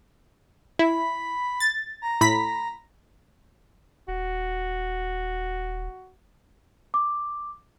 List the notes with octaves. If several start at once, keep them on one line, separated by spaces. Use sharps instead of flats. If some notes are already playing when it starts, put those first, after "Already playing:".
E4 B5
A6
A#5
A2 B5 B6
D#1 F#4
D6